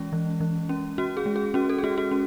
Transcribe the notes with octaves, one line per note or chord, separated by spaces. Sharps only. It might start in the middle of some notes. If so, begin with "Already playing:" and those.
Already playing: E3 G#3 C#4
E3
E3
C#4
C#4 F#4
G#4
G#3
G#4
C#4 F#4
A4
G#4
G#3 F#4
F#4
C#4